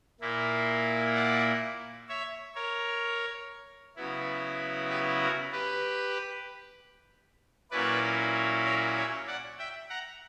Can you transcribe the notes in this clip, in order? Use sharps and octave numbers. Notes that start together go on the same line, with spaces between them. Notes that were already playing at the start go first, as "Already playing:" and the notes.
A#2 A#3 E4
D5 F#5
C#5 E5
A#4 C#5
C#3 F#3 B3 E4
G4 B4
F#4 A#4
G4 B4
A#2 F#3 C#4 E4 B4 D5
A#4 C#5
C#5 E5
D5 F#5
E5 G5
F#5 A#5